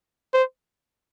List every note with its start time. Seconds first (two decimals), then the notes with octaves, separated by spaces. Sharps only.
0.34 C5